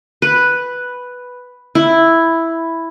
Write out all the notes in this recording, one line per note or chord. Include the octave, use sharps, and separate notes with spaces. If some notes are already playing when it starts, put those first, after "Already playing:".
B4
E4